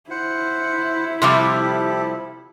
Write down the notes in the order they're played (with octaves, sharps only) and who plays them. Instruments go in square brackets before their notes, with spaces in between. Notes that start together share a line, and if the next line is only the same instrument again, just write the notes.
[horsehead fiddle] E4 [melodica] C5 F#5
[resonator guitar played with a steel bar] C3 F3 G3 [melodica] G4 A4 [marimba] C6 D6